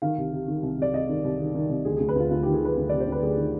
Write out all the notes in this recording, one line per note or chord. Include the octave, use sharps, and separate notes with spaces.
D#3 F5
C2
C3
D#3
C2
C2 D5
C2 D#5
D#3
C2
D#3
D#3
C2
D2 G#4
G#4
D2
B4
D2 F4
D2 F4
G4
D#3
G#4
D#3 B4
D2
C3 D5
C5
D2 B4
D2 G#4
D#3